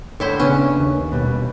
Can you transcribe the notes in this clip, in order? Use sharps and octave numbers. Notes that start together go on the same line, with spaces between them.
A2 D3 E4 C5 C#5
C#3 B3 C#4 D4
D#2
B2 G3